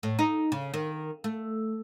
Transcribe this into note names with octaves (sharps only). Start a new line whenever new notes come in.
A2
D#4
C#3
D#3
A3